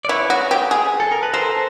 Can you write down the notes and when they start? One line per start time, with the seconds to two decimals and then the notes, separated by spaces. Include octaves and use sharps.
0.05 D5
0.09 E4 B4 C#5
0.30 F#4
0.51 G4
0.71 G#4
1.00 A4
1.12 A#4
1.23 B4
1.33 A4 A#4 C5